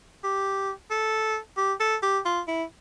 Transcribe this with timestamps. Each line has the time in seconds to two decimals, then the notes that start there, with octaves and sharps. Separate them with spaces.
0.24 G4
0.91 A4
1.58 G4
1.80 A4
2.03 G4
2.25 F4
2.48 E4